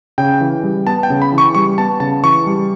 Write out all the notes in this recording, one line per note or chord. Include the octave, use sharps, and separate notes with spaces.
C#3 G5
E3
G3
B3 A5
G5
C#3
B5
E3 C#6
G3 C#6
B3 A5
C#3 A5
E3 C#6
G3